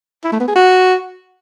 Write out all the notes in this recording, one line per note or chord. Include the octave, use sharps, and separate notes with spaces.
E4
A3
B3
G#4
F#4